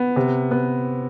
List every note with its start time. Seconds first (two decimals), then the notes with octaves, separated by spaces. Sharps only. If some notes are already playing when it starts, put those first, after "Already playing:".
Already playing: B3
0.16 C3
0.51 B3